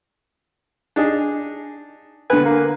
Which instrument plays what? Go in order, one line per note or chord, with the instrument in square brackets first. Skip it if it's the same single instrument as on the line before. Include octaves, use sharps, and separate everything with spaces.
[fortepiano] D4 D#4 G#4
[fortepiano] D3 B3 G#5 [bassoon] B4
[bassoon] A#3